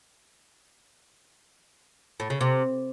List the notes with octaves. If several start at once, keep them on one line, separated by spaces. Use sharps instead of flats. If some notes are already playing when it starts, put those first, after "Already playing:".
A2
C#3
C3